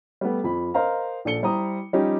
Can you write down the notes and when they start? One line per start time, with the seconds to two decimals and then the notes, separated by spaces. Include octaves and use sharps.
0.21 G3 A3 B3
0.44 F2 F3 B5
0.74 A#4 C5 D#5 F5 A#5
1.25 A#1 D4 A4 C#7 G7
1.43 G3 E4 C5 A#5 D#6
1.93 F3 G3 C#4 D#4 G4